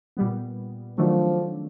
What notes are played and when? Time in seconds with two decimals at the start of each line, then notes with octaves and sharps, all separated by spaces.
0.17 A#2 G3 B3
0.98 C3 D#3 F3 F#3 A3 D4